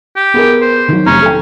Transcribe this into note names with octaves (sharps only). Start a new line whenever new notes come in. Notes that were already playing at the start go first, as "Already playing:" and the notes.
G4
B3 G#4 A#4
C5
D#3 F#3
F1 C#4 A#5
A4 G5